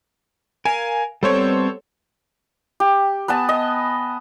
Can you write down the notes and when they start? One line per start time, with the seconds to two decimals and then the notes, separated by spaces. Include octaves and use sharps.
0.65 A#4 F5 G#5
1.23 G3 B3 C4 A4 C5 C#5
2.80 G4
3.28 B3 B4 G#5 A5
3.49 D#5